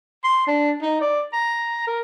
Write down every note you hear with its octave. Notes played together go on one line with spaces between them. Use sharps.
C6
D4
D#4
D5
A#5
A#4